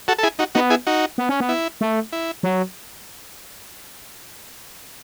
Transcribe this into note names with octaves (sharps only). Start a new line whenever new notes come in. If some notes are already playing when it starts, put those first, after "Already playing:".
F#4 A4
A4
E4 G#4
D#4 F#4
B3 D#4 F#4
E4 G#4
D#4 F#4
B3
C#4
B3
E4
A3
E4
F#3